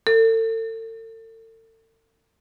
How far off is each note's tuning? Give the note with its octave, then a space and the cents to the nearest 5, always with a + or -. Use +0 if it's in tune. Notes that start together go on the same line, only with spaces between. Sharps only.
A4 +40